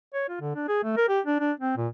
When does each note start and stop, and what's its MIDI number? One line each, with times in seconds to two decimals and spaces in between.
0.14 0.26 73
0.29 0.40 65
0.40 0.53 50
0.55 0.65 62
0.68 0.82 68
0.84 0.95 57
0.97 1.04 70
1.09 1.20 67
1.26 1.39 62
1.40 1.52 62
1.60 1.77 60
1.77 1.88 46